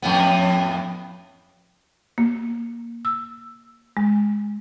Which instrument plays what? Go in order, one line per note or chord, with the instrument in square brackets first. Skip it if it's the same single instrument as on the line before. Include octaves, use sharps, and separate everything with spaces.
[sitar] F2 A2 B3
[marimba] A#3
E6
G#3